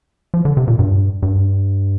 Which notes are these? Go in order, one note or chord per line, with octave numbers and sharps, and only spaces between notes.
F3
D3
C3
A#2
G2
G2